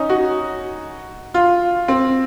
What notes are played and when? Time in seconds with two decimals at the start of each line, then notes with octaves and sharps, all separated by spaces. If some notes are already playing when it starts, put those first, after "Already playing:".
Already playing: C#4 D#4
0.09 F#4
1.34 F4
1.88 C4